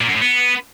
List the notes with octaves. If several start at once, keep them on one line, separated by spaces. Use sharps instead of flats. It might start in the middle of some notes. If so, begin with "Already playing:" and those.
A#2
F#2
A2
B3